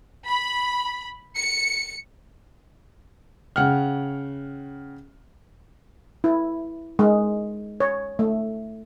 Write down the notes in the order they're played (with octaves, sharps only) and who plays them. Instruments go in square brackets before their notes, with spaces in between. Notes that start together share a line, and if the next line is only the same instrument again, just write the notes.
[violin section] B5
C#7
[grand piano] C#3 F#5 G5 F6
[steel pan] E4
G#3
C#5
A3